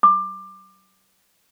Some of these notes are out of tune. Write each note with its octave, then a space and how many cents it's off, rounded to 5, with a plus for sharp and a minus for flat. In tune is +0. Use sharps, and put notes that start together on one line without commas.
D6 +20